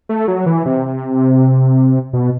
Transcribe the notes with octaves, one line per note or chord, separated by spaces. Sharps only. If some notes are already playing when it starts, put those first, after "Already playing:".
A3
F#3
E3
C3
B2